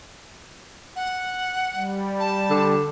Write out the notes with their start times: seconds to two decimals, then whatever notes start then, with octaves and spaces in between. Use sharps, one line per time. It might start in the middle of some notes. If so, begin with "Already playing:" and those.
0.96 F#5
1.74 G3
2.20 A5
2.50 D3